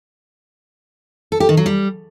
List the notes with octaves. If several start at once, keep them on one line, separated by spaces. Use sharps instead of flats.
A4
G4
D#3
F#3
G3